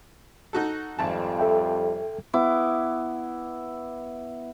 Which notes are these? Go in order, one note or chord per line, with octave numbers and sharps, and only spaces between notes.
D#4 F#4 A4
G#1 F2 G3 A5
A4 E5 G5
B3 E4 D6